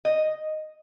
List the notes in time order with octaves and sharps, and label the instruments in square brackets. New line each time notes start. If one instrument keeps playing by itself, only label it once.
[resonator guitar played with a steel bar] D#5